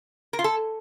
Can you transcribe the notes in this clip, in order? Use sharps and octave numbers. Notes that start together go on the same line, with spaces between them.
A#4
F4
A4